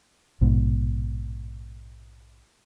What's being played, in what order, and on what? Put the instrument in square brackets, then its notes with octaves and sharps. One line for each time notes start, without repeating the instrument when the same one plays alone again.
[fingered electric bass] A#1 G#2 B2